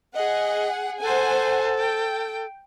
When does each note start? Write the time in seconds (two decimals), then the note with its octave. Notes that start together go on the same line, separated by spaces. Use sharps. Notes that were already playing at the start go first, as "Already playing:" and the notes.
0.15 G#4 D#5 F#5
1.02 A4 C5 F#5 G#5
1.79 G5